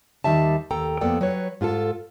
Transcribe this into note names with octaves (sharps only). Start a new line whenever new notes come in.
D#2 D#3 G3 E5 A5
D#2 A4 G5 A#5
F2 A#3 B3 A4 D5 G5
F#3 B4 C#5
G#2 F4 G#4 A4